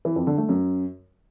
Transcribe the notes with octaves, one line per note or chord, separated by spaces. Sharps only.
E3
F2
D3
A3
F#2